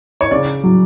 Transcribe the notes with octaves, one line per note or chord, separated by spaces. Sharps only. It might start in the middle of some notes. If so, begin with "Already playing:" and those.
C#5
C#3 D5
F#3